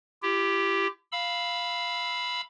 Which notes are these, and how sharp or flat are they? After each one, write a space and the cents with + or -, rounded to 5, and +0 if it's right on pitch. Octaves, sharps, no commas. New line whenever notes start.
E4 +45 G4 +0
F5 +0 B5 +0 E6 +0